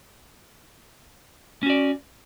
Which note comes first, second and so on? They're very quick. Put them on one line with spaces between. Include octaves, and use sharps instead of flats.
C#4 F#4 D5